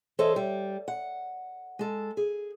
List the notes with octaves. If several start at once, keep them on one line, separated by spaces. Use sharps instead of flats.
E3 A4 C5 C#5 D#5
G3
F#5
G#3 A4
G#4